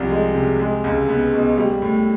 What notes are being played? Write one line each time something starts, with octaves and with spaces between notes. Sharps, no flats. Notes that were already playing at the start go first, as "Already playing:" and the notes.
Already playing: C2 F3 G3
G#3
C3
G#3
C#2
B3
B2
G3
A2